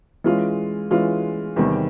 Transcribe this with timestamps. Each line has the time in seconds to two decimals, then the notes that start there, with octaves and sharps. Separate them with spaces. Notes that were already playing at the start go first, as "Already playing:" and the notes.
0.24 E3 G#3 C#4 F4
0.90 E3 G#3 C#4 F4
1.56 E2 C3 D#3 G3